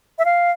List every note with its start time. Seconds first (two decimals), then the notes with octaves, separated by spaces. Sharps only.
0.19 E5
0.25 F5